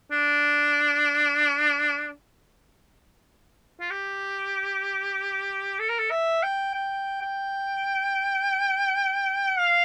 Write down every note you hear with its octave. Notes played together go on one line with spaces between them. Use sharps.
D4
F4
G4
A4
A#4
A4
E5
G5
G5
G5
F5